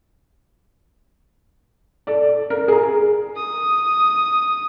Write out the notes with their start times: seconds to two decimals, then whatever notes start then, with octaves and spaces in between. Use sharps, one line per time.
2.07 A4 D5
2.50 A#4
2.68 G#4 A#5
3.36 D#6